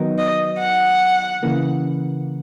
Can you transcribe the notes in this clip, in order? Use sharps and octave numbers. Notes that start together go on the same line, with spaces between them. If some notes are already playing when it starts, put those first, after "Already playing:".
Already playing: D#3 F#3 B3 D#4 A#4
D#5
F#5
C#3 E3 A#3